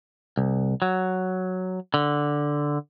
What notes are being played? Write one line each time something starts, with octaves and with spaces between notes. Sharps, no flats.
C2
F#3
D3